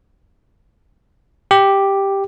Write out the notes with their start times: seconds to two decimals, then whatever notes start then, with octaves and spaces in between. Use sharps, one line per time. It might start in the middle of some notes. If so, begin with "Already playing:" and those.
1.51 G4